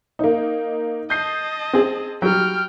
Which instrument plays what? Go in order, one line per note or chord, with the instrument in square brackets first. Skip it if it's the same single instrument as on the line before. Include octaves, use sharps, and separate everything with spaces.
[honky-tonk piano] A#3 D#4
[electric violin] D#5 A5 [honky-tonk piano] G6 C7
[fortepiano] C4 G#4
[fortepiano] F#3 G3 [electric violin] G5 F6